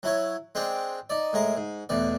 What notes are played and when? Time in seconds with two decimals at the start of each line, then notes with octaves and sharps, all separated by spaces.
0.03 F#3 E4 C#5
0.55 G#3 C4 D4 G5
1.10 D#4 D5
1.33 A2 G#3 A#4
1.57 G#2
1.89 A1 E2 B2 D5